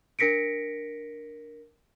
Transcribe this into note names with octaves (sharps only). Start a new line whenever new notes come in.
D4 A#4 A#6 B6 C#7 D7